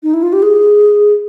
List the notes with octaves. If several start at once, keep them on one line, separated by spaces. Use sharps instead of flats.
D#4
E4
F4
G4
G#4